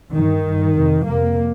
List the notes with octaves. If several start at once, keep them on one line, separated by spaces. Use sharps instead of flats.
G2 D#3
G2
F2 C3
F2 C3 A#3